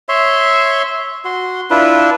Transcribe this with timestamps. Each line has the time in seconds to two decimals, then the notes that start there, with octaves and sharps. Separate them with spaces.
0.09 C#5 E5 C6
1.25 F#4 C6
1.70 D4 E4 F4 B4